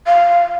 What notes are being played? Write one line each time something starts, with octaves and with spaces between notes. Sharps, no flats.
F5